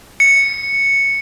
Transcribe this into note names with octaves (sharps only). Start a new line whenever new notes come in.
C#7